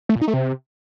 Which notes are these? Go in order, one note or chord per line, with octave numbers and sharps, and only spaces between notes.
A3
A#2
D#4
A3
C3